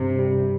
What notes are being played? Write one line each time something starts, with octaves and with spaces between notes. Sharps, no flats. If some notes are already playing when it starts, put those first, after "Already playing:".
Already playing: G2 C3 G3
G3